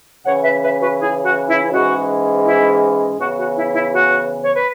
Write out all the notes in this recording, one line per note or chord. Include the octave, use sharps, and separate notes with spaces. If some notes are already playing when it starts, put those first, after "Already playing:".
C#3 E3 C#4 C#5 F#5
B4 E5
B4 E5
F#4 B4
E4 G#4
F#4
E4
E4
G#2 E3 G#3 C#4 F#4
E4
C#3 E3 B3 F#4
F#4
E4
E4
F#4
C#5
B4